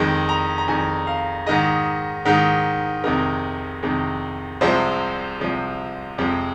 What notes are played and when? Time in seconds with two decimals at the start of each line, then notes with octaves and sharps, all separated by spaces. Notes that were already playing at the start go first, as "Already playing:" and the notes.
Already playing: F2 D#3 G#3
0.29 A#5
0.58 A#5
0.68 F2 D#3 G#3 G#5
1.07 F5
1.46 G#2 D#3 G#3 D#5
2.25 G#2 D#3 G#3
3.04 F2 C3 D#3 G#3 A#4
3.83 F2 C3 D#3 G#3
4.61 C2 C3 F3 G#3 C5
5.40 C2 C3 F3 G#3
6.18 F2 C3 F3 G#3